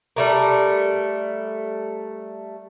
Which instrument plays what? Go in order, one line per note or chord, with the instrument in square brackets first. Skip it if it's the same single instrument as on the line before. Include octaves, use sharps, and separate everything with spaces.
[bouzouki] G3 A3 A#4